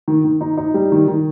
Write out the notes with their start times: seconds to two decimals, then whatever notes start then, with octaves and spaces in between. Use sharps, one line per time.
0.08 D#3
0.25 D#3
0.41 D#4
0.57 D#4
0.74 G3
0.92 D#3
1.08 D#3